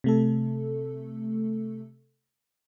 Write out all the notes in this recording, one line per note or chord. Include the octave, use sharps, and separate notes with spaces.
C3 A3 A4